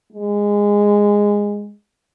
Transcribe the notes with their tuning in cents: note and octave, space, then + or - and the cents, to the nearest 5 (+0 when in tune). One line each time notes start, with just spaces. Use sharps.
G#3 -15